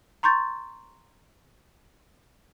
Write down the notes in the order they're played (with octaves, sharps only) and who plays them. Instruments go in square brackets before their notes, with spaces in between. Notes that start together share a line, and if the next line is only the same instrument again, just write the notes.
[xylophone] A#5 C6 C#6 G6 A6